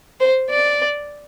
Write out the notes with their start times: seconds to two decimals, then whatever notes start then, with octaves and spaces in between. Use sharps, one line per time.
0.20 C5
0.50 D5